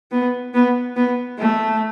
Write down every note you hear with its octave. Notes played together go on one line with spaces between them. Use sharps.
B3
B3
B3
A3